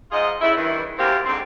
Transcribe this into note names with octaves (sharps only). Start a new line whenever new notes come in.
G#2 F4 G#4 D#5
A2 C#3 E4
G2 D#3 E3
F#2 A#3 C4 G4 A#4
G#2 D3 C4